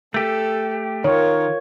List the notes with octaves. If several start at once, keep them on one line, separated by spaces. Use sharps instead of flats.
A3 G4 A4
D#3 F4 A#4 C#5